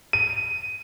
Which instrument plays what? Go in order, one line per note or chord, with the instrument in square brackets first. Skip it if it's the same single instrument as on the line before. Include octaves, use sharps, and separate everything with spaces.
[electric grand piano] D#7